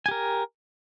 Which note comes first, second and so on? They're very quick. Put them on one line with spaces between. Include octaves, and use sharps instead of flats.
G#5 G4 A#4